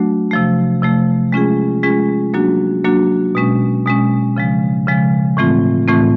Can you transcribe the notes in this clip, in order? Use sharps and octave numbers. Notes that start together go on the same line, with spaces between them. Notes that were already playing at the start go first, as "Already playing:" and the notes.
Already playing: F#3 A3 D4 F#4
C3 F3 A3
C3 F3 A3
G#3 C#4 F4 G#4
G#3 C#4 F4 G#4
F#3 A#3 D4 F#4
F#3 A#3 D4 F#4
B2 G#3 C#4
B2 G#3 C#4
C#3 F3 G#3
C#3 F3 G#3
A2 E3 A3 C4 F4
A2 E3 A3 C4 F4